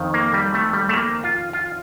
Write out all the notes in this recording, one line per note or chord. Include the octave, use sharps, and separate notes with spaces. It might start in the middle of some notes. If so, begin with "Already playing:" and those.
Already playing: F2 D#3
A#3
G3
A3
G3
A3
A#3
F4
F4